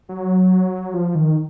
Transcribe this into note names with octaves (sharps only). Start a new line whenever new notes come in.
F#3
F3
D#3